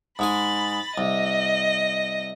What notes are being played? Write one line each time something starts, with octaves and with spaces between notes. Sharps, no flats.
G#2 G#3 G#5 B5 A6
C2 D#5